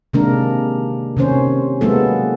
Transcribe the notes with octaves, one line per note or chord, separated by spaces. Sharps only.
C3 D#3 G#3 A#3 D4 A#4
C3 D#3 C#4 C5
F#3 G#3 A#3 B3 E4 A4